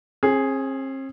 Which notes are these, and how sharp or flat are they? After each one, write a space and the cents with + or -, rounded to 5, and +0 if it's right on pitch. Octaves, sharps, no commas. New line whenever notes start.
C4 +45 G#4 +0